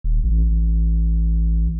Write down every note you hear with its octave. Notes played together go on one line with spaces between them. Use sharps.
D#1
A1